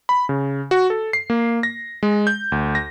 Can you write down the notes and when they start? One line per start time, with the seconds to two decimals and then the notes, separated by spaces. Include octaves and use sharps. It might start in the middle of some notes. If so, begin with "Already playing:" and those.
0.09 B5
0.29 C#3
0.71 F#4
0.90 A4
1.13 C7
1.30 A#3
1.63 A#6
2.03 G#3
2.27 G6
2.52 D2
2.75 A#6